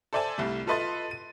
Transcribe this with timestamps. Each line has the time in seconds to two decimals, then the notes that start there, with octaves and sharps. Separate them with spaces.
0.13 A4 C5 D5 E5 G#5 A5
0.38 C2 G3 A3
0.67 F4 A4 B4 D#5 C6 A6
1.11 D#7